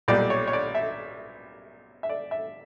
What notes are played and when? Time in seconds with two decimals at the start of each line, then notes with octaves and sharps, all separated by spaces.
0.08 B1 A#2 G3 D5
0.30 C#5
0.48 C#5
0.53 D5
0.75 E5
2.03 E5
2.09 D5
2.31 E5